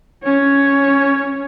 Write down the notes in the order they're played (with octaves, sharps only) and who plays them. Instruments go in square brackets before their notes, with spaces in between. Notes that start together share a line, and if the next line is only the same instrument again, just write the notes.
[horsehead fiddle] C#4 C#5